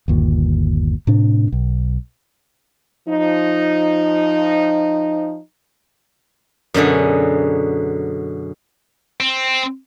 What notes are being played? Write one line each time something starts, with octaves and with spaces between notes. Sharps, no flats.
G1 D#2 A#2
A2 C3 D4
B1
F3 D#4
F#2 B2 D3 G#4
C4